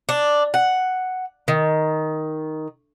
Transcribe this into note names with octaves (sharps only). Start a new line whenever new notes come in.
D4
F#5
D#3